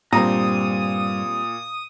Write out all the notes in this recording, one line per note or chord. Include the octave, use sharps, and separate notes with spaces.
G2 A#2 G3 C4 A#5 D#6